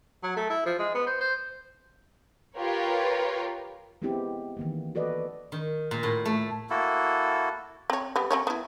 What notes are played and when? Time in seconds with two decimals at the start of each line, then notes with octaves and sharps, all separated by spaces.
0.23 F#3
0.36 A3
0.50 E4
0.66 F3
0.79 G#3
0.95 B3
1.07 C5
1.21 C5
2.58 F4 G4 A#4 B4 C#5
4.02 G#3 B3 C4 E4 G4
4.57 D#3 E3 A#3
4.95 F#4 A4 B4 D5 D#5
5.52 D#3
5.91 A#2
6.03 A2
6.25 A3
6.70 A#3 E4 F#4 A4
7.90 C4 C#5
8.16 G3 B3
8.31 C4 C#4 C#5
8.47 B3 E4